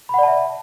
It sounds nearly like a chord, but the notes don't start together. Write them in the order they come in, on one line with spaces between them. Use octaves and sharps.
B5 F#5 D5 A5 E5